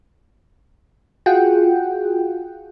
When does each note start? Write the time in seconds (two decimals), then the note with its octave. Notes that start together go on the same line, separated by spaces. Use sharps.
1.26 F4 F#4 G#4 F#5 G5